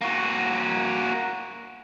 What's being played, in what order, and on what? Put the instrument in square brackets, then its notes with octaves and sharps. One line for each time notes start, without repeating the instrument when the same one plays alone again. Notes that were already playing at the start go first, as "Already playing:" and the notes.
[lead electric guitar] A#3 F#4